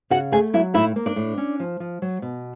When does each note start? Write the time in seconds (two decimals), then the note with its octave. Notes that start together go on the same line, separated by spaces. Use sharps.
0.10 C#3 F#4 F#5
0.32 A3 G#4 G#5
0.53 F#3 E4 E5
0.74 A2 E4 E5
0.96 A#3
1.06 D4 D5
1.16 A2
1.37 C#4
1.60 F3
1.80 F3
2.02 F#3
2.22 B2